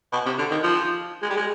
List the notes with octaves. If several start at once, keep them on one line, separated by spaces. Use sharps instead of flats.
B2
C3
D3
D#3
F3
G#3
G3
G#3